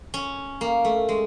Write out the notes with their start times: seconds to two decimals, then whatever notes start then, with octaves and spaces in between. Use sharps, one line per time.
0.14 C#4
0.61 A#3
0.85 A3
1.09 G#3